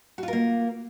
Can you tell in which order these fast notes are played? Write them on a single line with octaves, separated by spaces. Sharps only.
F#4 F4 A#4 A#3